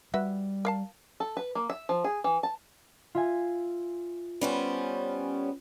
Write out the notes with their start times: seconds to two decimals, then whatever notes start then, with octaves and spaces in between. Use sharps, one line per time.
0.14 G3 F#4 B4 E5
0.65 A#4 F5 A5
1.20 A4
1.37 B4
1.55 A#3
1.70 E5
1.89 F3
2.04 G#4
2.24 E3
2.43 A5
3.15 F4 E5 G#5
4.41 G3 B3 C#4 C5